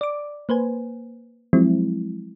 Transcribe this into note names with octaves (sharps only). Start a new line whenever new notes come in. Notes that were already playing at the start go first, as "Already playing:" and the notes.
D5 D6
A#3 B4 C5 G#5
F3 F#3 G#3 C4 E4